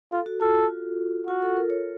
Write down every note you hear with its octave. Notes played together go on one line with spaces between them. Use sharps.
F4 A4
F#4
F4 A4
F4
F4 F#4
A4
A#4
C#5